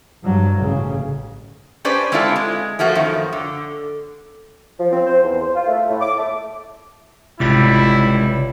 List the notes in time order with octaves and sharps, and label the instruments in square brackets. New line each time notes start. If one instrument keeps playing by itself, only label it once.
[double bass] G2 F#3
A1 C#3
[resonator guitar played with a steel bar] C#4 D4 G4 B4 C5 D5
G#3 C4 D4 E4 F4 A4
G#3
F3 A3 A#3 F#4
F#2 D#3 F3
D3
[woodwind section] F3
C4
C5
E2
C5
F4
A3
A2
D6
A3
[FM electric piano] G#1 F4 D6 [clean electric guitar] C#2 G3 [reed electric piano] C3 [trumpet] E4